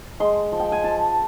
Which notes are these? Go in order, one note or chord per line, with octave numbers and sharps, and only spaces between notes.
G#3 C6
F3
G5
G#5
F3 A5